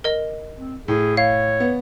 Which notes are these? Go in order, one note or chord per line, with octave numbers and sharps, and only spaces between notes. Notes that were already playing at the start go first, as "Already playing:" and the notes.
A#4 D#5
C4
A2 G#4
C#5 F5
B3